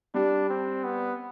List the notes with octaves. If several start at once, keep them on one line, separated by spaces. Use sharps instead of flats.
G3 D4
C4
B3